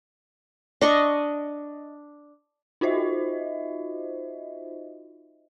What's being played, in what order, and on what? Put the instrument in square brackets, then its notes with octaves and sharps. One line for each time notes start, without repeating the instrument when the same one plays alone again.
[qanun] D4 D#5 C#6
[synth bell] D#4 F4 F#4 C5 D#5 E5